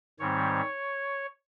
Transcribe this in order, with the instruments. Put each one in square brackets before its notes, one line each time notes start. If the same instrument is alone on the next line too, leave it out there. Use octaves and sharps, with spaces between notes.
[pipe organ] G#2 D#3 G3 C4 C#5